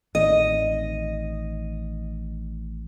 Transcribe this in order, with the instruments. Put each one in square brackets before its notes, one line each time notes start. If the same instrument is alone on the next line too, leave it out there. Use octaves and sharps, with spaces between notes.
[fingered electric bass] A1 D#3 C4 [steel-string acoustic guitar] D#5